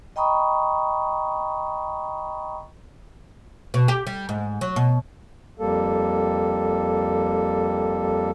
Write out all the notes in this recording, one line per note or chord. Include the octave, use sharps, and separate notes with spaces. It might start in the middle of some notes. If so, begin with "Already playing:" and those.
D#5 G5 A#5 B5 C#6 D#6
B2
G4
G3
G#2
F#3
B2
F2 G3 A#3 A4